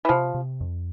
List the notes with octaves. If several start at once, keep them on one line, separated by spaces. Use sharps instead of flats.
E3
C3 F3
C3
F2